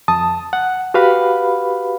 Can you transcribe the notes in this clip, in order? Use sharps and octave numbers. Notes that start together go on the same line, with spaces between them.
F2 A5 D#6
F#5
F#4 G4 B4 F5 B5